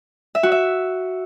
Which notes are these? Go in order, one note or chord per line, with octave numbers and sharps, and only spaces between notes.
E5
F#4
E5